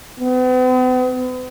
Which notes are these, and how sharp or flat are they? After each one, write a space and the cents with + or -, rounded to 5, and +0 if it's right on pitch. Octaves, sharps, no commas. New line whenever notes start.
B3 +45